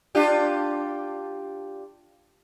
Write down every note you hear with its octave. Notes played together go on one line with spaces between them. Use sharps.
D4 F4 G4